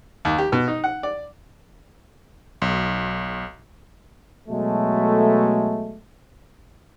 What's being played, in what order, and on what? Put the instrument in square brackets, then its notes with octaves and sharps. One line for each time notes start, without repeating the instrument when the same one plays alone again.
[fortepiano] D#2
G4
B2
D#4
F#5
D5
[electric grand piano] B1
[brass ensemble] B2 F#3 G#3 A3